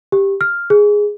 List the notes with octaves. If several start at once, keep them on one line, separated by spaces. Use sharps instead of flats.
G4
F6
G#4